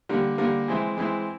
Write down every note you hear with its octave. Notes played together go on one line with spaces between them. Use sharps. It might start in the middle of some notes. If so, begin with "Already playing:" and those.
D3 G3 A#3
D3 G3 A#3
E3 G#3 C4 E4
E3 G#3 C4 E4